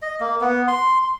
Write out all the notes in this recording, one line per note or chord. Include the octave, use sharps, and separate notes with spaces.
D#5
A#3
B3
C6